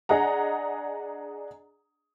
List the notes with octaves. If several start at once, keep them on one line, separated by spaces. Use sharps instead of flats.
D4 G#4 D#5 F#5 A#5